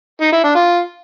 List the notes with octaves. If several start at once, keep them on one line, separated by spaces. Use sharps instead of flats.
D#4
E4
D4
F4